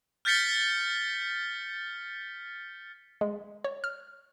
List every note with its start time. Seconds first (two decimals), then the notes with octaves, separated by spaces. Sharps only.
0.25 F6 G6 A6 B6 C#7 G7
3.21 G#3
3.64 C#5
3.84 F6